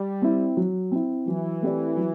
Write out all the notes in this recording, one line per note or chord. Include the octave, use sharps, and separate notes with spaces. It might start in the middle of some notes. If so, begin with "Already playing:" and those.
Already playing: G3
C4 E4
F#3
C4 E4
E3 F#3
A3 C4 G4 D5
F#3